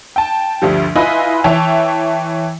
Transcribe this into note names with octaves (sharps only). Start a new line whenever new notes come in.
G5 A5
D2 G2 D3 F3 G3
E4 F4 B4 D#5 G#5 B5
E3 C#5 E5 G5 A5 F7